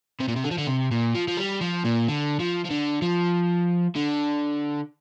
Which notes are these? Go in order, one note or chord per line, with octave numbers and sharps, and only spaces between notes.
C3
A#2
C3
D3
F3
D3
C3
A#2
F3
F3
G3
F3
A#2
D3
F3
F3
D3
F3
D3